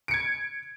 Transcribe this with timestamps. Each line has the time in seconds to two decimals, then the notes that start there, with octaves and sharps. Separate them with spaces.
0.08 D7
0.11 C#7
0.14 G#6